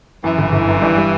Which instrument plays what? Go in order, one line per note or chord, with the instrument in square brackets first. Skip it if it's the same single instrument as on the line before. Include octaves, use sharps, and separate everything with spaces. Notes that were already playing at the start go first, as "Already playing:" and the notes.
[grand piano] F#2 [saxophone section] E3
[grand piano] G1
G1
F#2
G2
G3